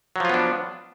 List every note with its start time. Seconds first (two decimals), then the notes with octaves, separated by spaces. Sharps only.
0.16 F#3
0.20 F3
0.25 F4
0.29 B3
0.34 D4